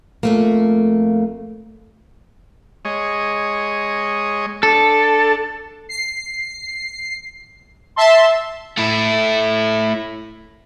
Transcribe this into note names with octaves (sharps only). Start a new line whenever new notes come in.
F2 A3 A#3
G#3 C#5 D#5
D4 A4 A5
C7
E5 A5 C6
A3 E4